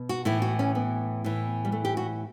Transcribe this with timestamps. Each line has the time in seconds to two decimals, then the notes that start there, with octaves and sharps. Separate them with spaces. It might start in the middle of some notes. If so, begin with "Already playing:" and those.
Already playing: B2
0.09 F#4
0.25 A2 E3 E4
0.42 F#4
0.59 C#4
0.75 B3
1.24 A2 E3
1.65 G3
1.72 A3
1.85 G4
1.97 F#4